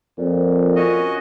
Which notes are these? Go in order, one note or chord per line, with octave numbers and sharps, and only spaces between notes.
F2 A#2
C#4 F#4 D#5